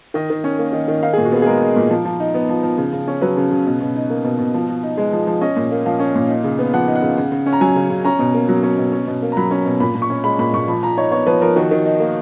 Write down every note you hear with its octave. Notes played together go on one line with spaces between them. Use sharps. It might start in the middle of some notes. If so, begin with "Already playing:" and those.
D#3 D#5
D#3
C#4
A#3
D#3
D#3
D#4 F5
G#4
A#2
F#4
B3 G#4
G#4
G#3 A#4
D#4
A#2
F3
F3
D#4
B3
F3
F3
C#3
C#3
C#4
F#3 B4
C#3
C#3
B2
B2
D#4
A#3
B2
B2
F3
F3
D#4
G#3
F3
F3
C#4 D#5
A#2
A#3
F3 F5
C#4
A#2
D#4
C#3
B3
F3 F#5
D#4
F#5
C#3
C#3
C#3
C#4
A#5
F#3 G#5
C#3
C#3
C#4 A#5
B2
A#3
F#3
C#4
B2
C#4
B2
A#3
A#5
F#3 B5
C#4
B2
A#2 B5
A#2
C#6
C#4
G#3 B5
A#2 B5
A#2 C#6
F3 B5
F3 A#5
D#4 C#5
B3 C#5
F3 B4
F3 A#4
D#3 F#4
D#3
D#4
A#3